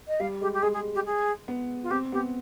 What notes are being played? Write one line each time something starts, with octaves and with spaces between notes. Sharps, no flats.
D#5
G3 F5
G#3 G4
G4
G#3 G#4
G#4
G4
G#4
B3
F4
C4 G4
B3 G4